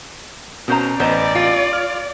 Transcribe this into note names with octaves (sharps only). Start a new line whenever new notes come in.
B2 C#4 C5 A#5
A1 B3 C5 D5 D#5 A#5
F4
F6